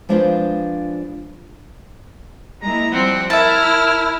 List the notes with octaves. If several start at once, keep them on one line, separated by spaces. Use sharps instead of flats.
F3 G#3 D4 F4 B4 C5
G#3 A#3 E4 A#5
F3 G3 C4 F#5
E4 A#4 E5 A5 F6